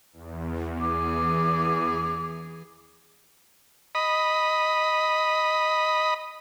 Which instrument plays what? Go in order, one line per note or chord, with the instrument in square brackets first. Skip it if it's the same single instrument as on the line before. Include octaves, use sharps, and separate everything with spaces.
[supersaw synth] E2
[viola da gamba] E3 G#4 [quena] D6
[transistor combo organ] D#5 B5